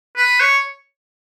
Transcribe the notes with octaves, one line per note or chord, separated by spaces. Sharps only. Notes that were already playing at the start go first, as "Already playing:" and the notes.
B4
C#5